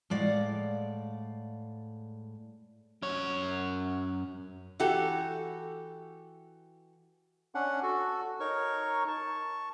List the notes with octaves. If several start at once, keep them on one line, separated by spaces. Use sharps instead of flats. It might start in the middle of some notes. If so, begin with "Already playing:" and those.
A2 G#3 D5 F5 F#5
F#2 C#5
E3 F#4 G4 A4
C#4 D4 F#5
F#4 A4
D#4 A#4 C#5 C#6
A5 C#6